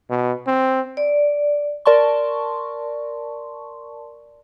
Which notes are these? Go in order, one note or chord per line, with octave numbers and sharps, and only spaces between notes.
B2
C4
D5
A#4 D5 A5 C6 C#6